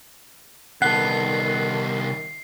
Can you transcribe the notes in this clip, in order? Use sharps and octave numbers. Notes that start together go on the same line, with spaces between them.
C2 D#3 B3 A4 F#5 C7